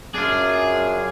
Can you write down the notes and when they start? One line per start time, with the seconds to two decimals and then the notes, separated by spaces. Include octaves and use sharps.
0.14 F#2 D4 F4 G#4